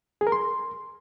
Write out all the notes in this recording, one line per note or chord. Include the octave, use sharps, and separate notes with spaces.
G#4
A#4
C6